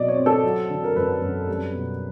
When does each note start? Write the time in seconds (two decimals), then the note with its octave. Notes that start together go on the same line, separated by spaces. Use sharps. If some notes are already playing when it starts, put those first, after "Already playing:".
Already playing: B2 F#3 D5 D#5
0.08 C#5
0.17 C4
0.26 A4
0.43 F#3
0.70 D3
0.84 A#4
0.96 F#2 B4
1.22 F#2
1.48 G3
1.74 B2